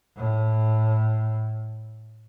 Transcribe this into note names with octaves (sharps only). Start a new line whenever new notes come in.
A2